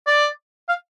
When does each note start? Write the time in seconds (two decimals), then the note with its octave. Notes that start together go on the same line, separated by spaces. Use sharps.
0.07 D5
0.68 F5